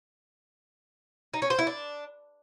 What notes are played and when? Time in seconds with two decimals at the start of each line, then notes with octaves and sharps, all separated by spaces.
1.34 D#4
1.42 C#4
1.50 C5
1.59 E4
1.67 D4